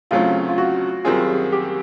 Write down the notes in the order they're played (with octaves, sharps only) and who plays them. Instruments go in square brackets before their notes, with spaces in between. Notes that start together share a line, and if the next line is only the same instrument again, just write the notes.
[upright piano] D2 C#3 F#3 A3 C4 [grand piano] F4
[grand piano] F4
F#4
[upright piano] F#2 D#3 G3 C4 F4 [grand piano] G#4
[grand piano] G4